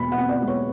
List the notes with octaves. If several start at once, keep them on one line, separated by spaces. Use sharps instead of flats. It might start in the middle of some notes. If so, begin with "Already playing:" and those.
Already playing: E2 B2 G#3 B5
F#5
C4
D5
G#3
C#5